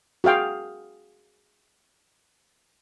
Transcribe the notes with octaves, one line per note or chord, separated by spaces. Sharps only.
F#4 G#4 F5 G5